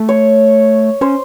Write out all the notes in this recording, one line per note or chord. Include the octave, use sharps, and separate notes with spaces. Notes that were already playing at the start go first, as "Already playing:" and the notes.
Already playing: A3
C#5
C#4 C5